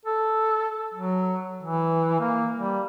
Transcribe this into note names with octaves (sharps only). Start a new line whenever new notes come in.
A4
F#3
E3
A#3
G3